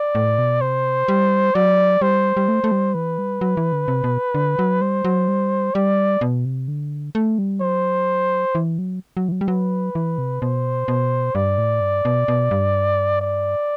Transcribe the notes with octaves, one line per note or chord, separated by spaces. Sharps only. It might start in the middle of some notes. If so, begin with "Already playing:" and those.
Already playing: D5
A2
B2
C3 C5
G3
F#3 D5
G3 C5
G3
A3
A3
G3
E3 B4
G3
F#3
E3
D3
C3
B2
D3
F#3
G3 C5
F#3
G3
G3 D5
B2
C3
D3
A3
G3
F#3 C5
E3
F#3
F#3
E3
F#3
G3
F#3 B4
E3
C3
B2 C5
B2
G2 D5
A2
G2
B2
B2
G2
D5